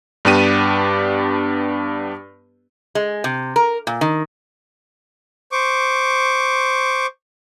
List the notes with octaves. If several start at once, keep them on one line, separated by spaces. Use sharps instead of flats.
G2 B3 D4 G4 D#7
G#3
C3
A#4
A#2
D#3
C5 C#6 D6